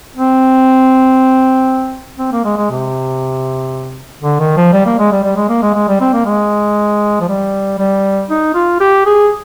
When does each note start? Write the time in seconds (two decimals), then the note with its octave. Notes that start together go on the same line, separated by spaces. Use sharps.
0.16 C4
2.19 C4
2.32 A#3
2.45 G#3
2.58 G#3
2.70 C3
4.22 D3
4.40 D#3
4.57 F3
4.73 G3
4.86 A#3
4.99 G#3
5.12 G3
5.24 G3
5.36 G#3
5.49 A#3
5.63 G#3
5.75 G#3
5.88 G3
6.01 C4
6.13 A#3
6.25 G#3
7.21 F3
7.28 G3
7.79 G3
8.30 D#4
8.55 F4
8.80 G4
9.06 G#4